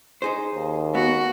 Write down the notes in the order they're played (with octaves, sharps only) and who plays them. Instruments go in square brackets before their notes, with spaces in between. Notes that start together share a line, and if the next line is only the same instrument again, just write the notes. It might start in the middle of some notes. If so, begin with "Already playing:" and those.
[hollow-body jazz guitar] D#4 G#4 C5
[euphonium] D#2
[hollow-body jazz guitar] B3 [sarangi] F#4